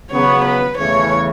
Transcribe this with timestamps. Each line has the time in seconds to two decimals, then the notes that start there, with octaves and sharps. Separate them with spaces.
0.11 C#3 F#3 B3 C#5
0.45 B4
0.78 E2 C#3 E3 A3 C#5